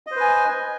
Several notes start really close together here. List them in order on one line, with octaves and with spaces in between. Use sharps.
D#5 C5 B4 G#5